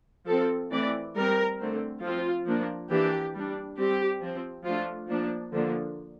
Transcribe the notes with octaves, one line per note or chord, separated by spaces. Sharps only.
F3 C4 A4
E3 A3 C4 D5
G3 C4 A#4
D3 A3 C4
F3 C4 F4
F3 A#3 D4
E3 A#3 D4 G4
G3 D4
G3 C4 G4
F3 C4
F3 A3 D4 F4
F3 A#3 D4
D3 F3 A#3 D4